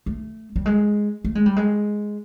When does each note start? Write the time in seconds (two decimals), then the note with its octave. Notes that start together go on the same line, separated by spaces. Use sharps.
0.06 A3
0.56 G3
0.66 G#3
1.24 A3
1.35 G#3
1.46 G3
1.56 G#3